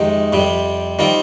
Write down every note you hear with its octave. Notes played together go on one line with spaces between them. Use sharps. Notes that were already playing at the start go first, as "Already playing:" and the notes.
Already playing: F2 C3 D#3 G#3 D#4
F2 C3 G3
D#3 G3 C4 F4